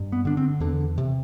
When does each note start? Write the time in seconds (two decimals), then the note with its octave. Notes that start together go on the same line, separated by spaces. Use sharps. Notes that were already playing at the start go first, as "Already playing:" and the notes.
Already playing: G2
0.12 B3
0.25 D3 D4
0.37 C4
0.60 E2 D3
0.98 C3